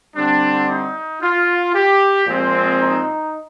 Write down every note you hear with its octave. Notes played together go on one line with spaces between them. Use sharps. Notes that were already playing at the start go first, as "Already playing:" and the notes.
D3 G3 C4 D4
D#4
F4
G4
A#2 F3 G#3 C4
D#4